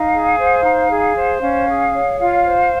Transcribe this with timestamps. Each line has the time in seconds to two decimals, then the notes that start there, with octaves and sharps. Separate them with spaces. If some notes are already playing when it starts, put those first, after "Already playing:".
Already playing: D#4 F5
0.13 G#4
0.39 C5
0.65 D#4
0.91 G#4
1.16 C5
1.42 C#4 F5
1.68 G#4
1.94 C#5
2.19 F4 F5
2.45 C5